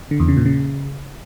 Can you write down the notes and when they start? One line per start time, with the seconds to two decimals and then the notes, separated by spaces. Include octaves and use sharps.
0.11 D3
0.20 E2
0.28 C#3
0.37 A#2
0.46 C#3